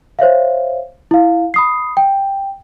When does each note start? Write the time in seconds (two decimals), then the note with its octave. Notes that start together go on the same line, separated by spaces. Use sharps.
0.19 C5 C#5 E5 F5
1.11 E4 F5
1.54 B5 D#6 C7
1.97 G5